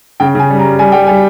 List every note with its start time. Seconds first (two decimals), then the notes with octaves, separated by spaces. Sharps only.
0.20 C#3 G5
0.35 C#3 G#5
0.50 G3
0.59 A#5
0.65 G3
0.79 G3 G#5
0.92 G3 G5
1.07 G3 G#5